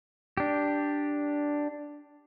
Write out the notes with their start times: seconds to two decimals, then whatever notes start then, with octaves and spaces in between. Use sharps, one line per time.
0.37 D4 G4